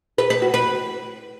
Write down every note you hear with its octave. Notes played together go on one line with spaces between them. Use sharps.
B4
B4
F#4
B4